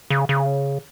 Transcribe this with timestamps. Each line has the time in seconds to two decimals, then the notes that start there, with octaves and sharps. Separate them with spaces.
0.10 C#3
0.29 C#3